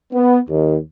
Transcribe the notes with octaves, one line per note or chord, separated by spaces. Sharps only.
B3
D#2